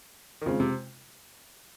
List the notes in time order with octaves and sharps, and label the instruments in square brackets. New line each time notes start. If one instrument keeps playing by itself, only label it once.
[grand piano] D#3
[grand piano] C#3 [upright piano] G#3 C4 F4
[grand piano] C3